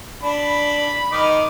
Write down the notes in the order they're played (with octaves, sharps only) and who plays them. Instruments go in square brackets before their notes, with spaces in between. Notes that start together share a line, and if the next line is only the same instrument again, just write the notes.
[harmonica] D4 [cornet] B5
[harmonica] D#3 D#4 D6